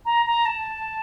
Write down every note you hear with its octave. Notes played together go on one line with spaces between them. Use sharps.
A#5
A#5
A5